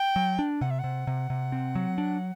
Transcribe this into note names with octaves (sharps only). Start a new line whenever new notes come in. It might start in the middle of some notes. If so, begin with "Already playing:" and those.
Already playing: G5
F#3
D4
C3 F#5
E5
C3 F#5
C3
C3
C4
F#3
D4